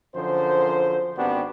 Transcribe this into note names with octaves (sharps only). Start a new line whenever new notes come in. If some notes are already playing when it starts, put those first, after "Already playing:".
F#2 D3 F3 C5
G#1 B3 C4 D4 F#4 G4